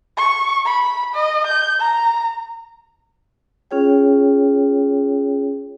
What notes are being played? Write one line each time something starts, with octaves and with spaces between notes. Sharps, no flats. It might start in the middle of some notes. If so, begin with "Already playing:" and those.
C#6
B5
D#5
G6
A#5
C#4 F4 G#4 C#5 G5